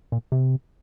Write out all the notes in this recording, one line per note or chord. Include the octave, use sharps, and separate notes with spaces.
A#2
C3